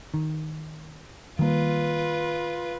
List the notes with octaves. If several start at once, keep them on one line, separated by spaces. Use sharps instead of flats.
D#3
D#3 G3 A#3 F4 B4